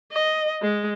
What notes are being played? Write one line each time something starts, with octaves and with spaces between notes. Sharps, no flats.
D#5
G#3